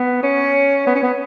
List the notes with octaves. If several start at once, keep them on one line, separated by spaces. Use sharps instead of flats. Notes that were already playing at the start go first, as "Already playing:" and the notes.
Already playing: B3
C#4
B3
C#4
B3